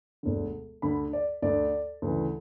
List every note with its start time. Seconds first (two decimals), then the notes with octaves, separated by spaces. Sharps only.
0.23 E1 D2 D3
0.82 D2 D3 B5
1.13 D5
1.42 D2 D3 D5
2.02 D2 C#3 E3